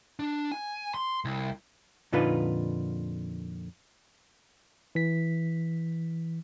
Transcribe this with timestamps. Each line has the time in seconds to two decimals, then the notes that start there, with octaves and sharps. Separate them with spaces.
0.19 D4
0.52 G#5
0.94 C6
1.25 C2
2.12 F2 A#2 D3 D#4 F4 B4
4.95 E3 B6